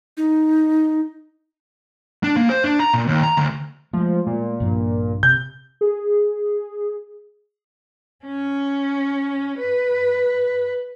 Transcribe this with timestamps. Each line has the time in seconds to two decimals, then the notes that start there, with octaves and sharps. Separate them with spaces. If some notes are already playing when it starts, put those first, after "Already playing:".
0.17 D#4
2.24 D4
2.37 A#3
2.50 C5
2.64 D4
2.80 A#5
2.94 A#2
3.08 D#2
3.23 A#5
3.37 D2
3.93 F3 G#3 A3
4.27 A#2
4.60 A#1 G2 F3
5.23 C3 G6
5.81 G#4
8.25 C#4
9.59 B4